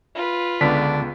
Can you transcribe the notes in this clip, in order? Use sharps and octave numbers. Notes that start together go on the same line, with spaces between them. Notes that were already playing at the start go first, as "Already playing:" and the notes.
F4 B4
C#2 D3 B3 D4 B6